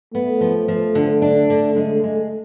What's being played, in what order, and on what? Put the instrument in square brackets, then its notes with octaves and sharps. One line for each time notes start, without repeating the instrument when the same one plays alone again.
[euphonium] A3 [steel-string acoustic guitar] B3
[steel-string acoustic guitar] F3
F3
D3
D4
D3
G#3
G#3